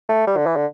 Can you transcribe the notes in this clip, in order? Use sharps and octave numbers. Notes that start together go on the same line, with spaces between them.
A3
G3
D3
E3
D3